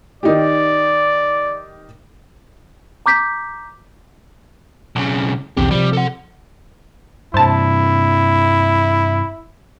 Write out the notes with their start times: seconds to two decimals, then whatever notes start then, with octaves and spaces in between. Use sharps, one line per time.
0.23 D#3 D#4 G4 D5
3.06 A#5 D6 G6 B6
4.96 B1 C#3
5.57 B1 E2 C#3 C4 G4
5.71 C3 F3 G3
5.93 A4 F#5
7.34 G2 C3 E4 C5 A5